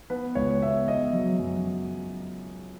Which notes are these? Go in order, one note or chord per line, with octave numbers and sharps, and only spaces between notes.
B3 B4
C#2 C#5
B3 E5
B3 D#5
F#3
F#2